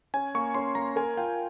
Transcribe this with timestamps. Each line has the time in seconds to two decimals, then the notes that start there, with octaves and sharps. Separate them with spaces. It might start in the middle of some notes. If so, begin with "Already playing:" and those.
0.14 C#4 G#5
0.35 A#3 C#6
0.55 C#4 C6
0.75 A#3 A#5
0.96 A#4 G#5
1.17 F4 G5